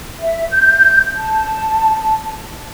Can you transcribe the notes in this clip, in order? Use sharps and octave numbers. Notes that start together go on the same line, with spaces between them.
E5
G6
A5